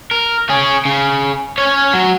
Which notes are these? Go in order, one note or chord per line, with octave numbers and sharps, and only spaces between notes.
A#4
C#4 G#4
C#3
C#4 C#5
F#3